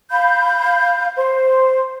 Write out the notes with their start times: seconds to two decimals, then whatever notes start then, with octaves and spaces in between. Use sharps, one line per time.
0.11 F5 B5 G6
1.16 C5